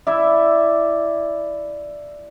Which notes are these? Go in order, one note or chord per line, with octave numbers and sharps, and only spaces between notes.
E4 D5 E5